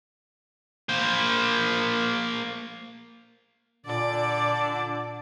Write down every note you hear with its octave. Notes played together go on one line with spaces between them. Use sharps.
A#3 C5
A#2 D3 D5